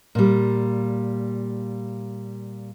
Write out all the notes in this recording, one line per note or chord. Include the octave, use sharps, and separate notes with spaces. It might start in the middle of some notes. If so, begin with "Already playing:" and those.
A#2 G3